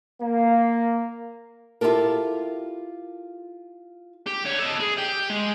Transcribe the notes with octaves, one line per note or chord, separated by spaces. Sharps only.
A#3
E4 F4 G4 A4 A#4
G4
D3 C#5
A4 D#5
G#4
G4 G5
G#3